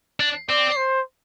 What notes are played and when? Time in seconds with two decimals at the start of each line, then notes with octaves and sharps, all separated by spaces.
0.20 D4
0.49 C4 D5
0.76 C5